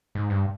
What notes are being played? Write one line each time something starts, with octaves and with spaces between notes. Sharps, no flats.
G#2
G2